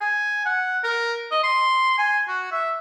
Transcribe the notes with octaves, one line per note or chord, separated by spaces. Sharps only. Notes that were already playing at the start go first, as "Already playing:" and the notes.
G#5
F#5
A#4
D#5
C6
G#5
F#4
E5